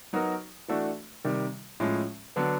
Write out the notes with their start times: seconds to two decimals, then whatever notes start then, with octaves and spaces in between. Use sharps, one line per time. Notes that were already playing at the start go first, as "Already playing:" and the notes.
0.13 F#3 B3 D#4 F#4 A#4
0.68 E3 A3 D4 F#4 A4
1.25 C3 D#3 G3
1.80 A2 F3 G#3 C#4
2.36 D3 F#3 B3 D4